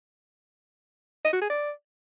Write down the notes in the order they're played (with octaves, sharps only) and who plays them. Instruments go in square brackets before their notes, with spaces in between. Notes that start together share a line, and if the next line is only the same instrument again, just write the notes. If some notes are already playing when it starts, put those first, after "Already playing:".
[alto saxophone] D#5
F#4
G#4
D5